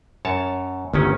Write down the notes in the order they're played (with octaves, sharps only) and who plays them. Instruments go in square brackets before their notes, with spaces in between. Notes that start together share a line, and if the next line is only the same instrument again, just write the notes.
[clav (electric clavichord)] F#2 C#5 A5
[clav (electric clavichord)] G1 D#3 C#4 [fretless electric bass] D2